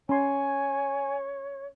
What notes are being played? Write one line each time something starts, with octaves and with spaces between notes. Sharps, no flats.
C#4 C#5 G#5 C6